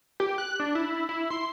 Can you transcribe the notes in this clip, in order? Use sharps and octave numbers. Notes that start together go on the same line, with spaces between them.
G4
F#6
D4
E4
E4
C6